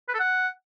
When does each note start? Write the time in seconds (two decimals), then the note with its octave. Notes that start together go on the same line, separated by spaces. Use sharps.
0.09 B4
0.14 A4
0.20 F#5